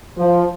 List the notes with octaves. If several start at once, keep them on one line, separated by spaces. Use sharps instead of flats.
F3